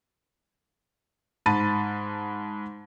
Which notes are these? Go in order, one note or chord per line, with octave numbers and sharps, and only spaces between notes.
G#2 A5 B5 A6 D#7